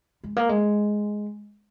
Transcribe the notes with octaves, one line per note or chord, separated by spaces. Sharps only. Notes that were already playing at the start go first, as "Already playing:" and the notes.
G#3
A#3
G#3